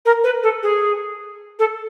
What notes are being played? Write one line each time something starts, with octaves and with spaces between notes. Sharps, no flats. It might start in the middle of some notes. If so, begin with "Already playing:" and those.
A#4
B4
A4
G#4
A4